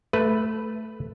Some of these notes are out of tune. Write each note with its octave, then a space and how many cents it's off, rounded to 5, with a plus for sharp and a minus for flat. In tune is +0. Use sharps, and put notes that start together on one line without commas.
A3 +0 B4 +0